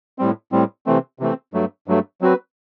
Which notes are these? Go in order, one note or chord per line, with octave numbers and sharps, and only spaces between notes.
A2 G3 C4
A2 G3 C4
C3 E3 A3 C4
C3 E3 A3 C4
G2 F#3 A3
G2 F#3 A3
F#3 C4 F#4 B4